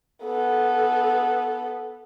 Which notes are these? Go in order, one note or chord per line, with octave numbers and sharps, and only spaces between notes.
B3 A4